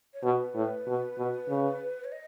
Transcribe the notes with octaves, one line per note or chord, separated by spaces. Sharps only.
C#5
B2 B4
A2
B2
B2
C#3
C#5
D#5